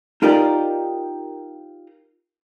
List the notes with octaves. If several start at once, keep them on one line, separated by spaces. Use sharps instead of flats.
D#4 F4 G4 A#4 D5 D#5